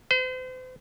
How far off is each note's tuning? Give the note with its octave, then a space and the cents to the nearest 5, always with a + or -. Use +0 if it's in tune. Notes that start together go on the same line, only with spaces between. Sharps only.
C5 -40